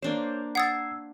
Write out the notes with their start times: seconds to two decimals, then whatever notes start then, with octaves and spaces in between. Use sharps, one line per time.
0.02 A#3 D4 C5 C#5
0.55 F#5 D#6 E6 G#6 A6 C7